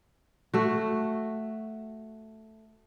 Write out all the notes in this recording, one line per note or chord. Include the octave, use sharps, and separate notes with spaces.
A3 F#4